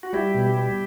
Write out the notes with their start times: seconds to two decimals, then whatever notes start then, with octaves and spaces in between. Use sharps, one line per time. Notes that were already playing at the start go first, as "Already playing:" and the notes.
0.03 F#4
0.13 G3 E4 G4
0.35 B2
0.57 G3